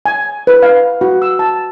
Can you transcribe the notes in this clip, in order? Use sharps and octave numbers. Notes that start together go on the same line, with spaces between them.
G#5
B4
F5
F#4
E6
A5